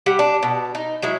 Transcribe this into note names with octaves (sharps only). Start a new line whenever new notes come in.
G3 G4 F#5
D4
B2
D#4
F#3 G#3 E4